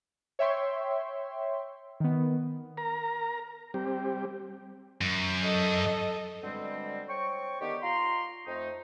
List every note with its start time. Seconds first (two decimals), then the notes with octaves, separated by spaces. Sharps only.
0.39 C#5 E5 G5 C6 C#6
2.00 D#3 B3
2.77 A#4 A#5
3.74 G3 C4 G4
5.01 F#2
5.41 A4 D#5
6.43 B2 D3 G3 G#3 C4
7.09 C5 C#5 G5 C#6
7.61 D3 D#3 B3 G4
7.82 F4 A#5 C6
8.46 F2 A3 D#4